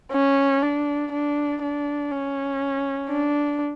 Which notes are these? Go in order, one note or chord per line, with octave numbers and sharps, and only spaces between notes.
C#4
D4
D4
D4
C#4
D4